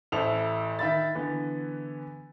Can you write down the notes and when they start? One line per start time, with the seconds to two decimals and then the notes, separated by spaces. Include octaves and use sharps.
0.12 A1 E4 A4 C5 F7
0.79 D#3 E5 B5 A6
1.15 D3 E3 B3